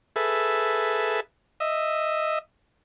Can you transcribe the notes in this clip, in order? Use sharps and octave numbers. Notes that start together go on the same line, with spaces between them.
G#4 A4 B4 E5
D#5 E5